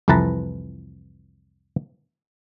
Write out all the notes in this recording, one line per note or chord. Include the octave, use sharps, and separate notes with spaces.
C2 F2 E3 B4 A5 A#5